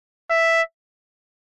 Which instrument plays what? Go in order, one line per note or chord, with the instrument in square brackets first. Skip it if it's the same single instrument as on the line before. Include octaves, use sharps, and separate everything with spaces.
[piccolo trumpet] E5